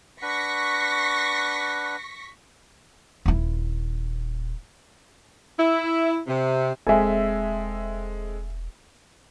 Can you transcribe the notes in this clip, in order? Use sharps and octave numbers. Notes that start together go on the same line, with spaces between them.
D4 B4 F#5 C#6 A#6 B6
D#1 E4
E4
C3
E1 G#3 C4 A4 E5 G#5